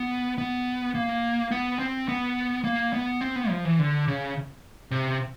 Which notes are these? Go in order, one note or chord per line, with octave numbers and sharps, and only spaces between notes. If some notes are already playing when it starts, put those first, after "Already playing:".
Already playing: B3
B3
A#3
B3
C4
B3
A#3
B3
C4
B3
F3
E3
D3
C#3
C3